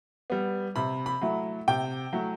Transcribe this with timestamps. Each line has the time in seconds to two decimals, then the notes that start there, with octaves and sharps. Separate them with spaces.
0.30 G3 B3
0.76 C3 B5
1.06 B5
1.21 F#3 A3 E4
1.68 C3 G5
2.13 F#3 A3 E4